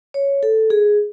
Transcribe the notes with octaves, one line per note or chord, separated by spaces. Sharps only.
C#5
A4
G#4